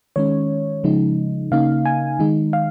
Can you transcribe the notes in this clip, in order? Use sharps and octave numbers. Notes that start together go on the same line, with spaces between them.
D#3 G#3 C#4 C#5
C#3 F3 G#3 D#4
C#3 A#3 D#4 F5
G#5
D#3 G#3 D#4
F5